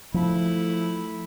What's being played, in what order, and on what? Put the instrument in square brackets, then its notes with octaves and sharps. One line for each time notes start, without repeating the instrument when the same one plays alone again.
[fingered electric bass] F3 [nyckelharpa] A3 E4